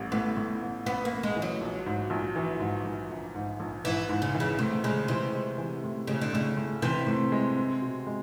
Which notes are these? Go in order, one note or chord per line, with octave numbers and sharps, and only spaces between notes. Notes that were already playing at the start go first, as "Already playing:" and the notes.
Already playing: A1 A2 G3
A2 B3
A2
A1
A1 B3
A#3
A1
G#3
E3
F#3
A#1
G#2
A#1
E3
G#2
A#1
A#1
G#2
A#1
G#2 E3
G#2
C#3
E3
C#3
A2 C3
C#3 G#3
C3 E3
G#3
E3
A2
A2 C#3
D3
A2 C#3
A2
C3 E3
A2
G#3
C4
B2
G#3